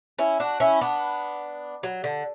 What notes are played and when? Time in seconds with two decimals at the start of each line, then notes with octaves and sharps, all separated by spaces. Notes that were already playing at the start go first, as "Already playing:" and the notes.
0.19 C#4 E4
0.40 D4 F#4
0.60 C#4 E4
0.81 B3 D4
1.83 F#3
2.04 D3